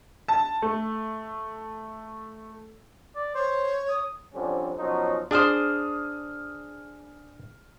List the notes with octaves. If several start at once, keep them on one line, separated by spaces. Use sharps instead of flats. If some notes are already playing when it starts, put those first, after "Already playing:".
A5
A3
D5
C5 C#5
D#6
D3 F3 G3 C4 C#4
B2 F3 F#3 C#4 D#4
D4 G#4 C5 D#6 F6